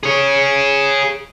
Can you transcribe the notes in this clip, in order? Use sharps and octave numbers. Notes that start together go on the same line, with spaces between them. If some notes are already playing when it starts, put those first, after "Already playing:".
G#4 C#5